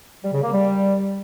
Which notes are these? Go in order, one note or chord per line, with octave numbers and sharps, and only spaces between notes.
G3
C#3
A#3
G3